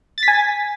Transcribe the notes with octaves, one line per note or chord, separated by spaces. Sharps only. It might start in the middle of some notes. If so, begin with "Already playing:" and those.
A6
B6
G#5